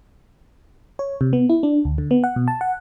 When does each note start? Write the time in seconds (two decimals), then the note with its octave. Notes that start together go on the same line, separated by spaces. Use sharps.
0.99 C#5
1.21 C3
1.33 B3
1.50 E4
1.63 D4
1.85 D2
1.98 D3
2.11 B3
2.24 F#5
2.36 B2
2.48 A5
2.61 F#5